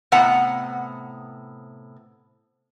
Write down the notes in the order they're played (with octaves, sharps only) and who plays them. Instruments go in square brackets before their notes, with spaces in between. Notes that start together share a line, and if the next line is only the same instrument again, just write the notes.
[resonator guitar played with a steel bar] A2 C3 B3 F#5 A#5